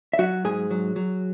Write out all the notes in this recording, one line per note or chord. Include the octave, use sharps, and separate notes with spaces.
E5
F#3 F#4 F#5
G#2 G#4 G#5
F#3
F#3